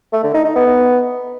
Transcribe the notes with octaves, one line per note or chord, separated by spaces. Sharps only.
A3
D3
D#4
D#4
B3